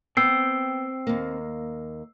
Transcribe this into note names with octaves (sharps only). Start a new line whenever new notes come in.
B3 C4 G5 E6 C7
D#2 A#3